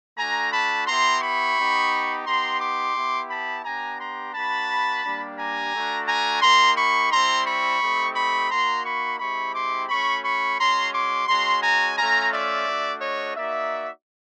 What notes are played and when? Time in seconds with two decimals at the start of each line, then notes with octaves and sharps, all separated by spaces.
0.18 A3 D4 F#4 G#5 A#5
0.52 A5 B5
0.87 B3 E4 G4 A#5 C6
1.22 B5 C#6
1.57 B3 D#4 G4
2.26 B3 D#4 G4 A#5 C6
2.61 C6 D6
2.96 B3 E4 G4
3.30 A5 B5
3.64 B3 D4 G4 G#5 A#5
4.00 A#5 C6
4.34 A#3 D4 F#4 A5 B5
5.04 G3 A#3 D4 G4
5.38 G#5 A#5
5.73 A3 D4 F#4
6.08 G#5 A#5
6.42 A#3 D#4 G4 A#5 C6
6.77 B5 C#6
7.12 G3 C4 E4 A#5 C6
7.46 B5 C#6
7.81 A3 C4 D#4 G4
8.16 B5 C#6
8.50 A#3 D#4 F#4 A#5 C6
8.85 B5 C#6
9.20 G#3 C4 E4 G4 B5 C#6
9.54 C6 D6
9.89 A3 C#4 F#4 B5 C#6
10.24 B5 C#6
10.59 G#3 C#4 F#4 A#5 C6
10.94 C6 D6
11.28 G#3 C#4 F#4 A#5 C6
11.63 G#5 A#5
11.97 A3 C#4 F4 G#5 A#5
12.32 D5 E5
12.67 A3 D4 F#4
13.01 C#5 D#5
13.36 A#3 D#4 F#4 D5 E5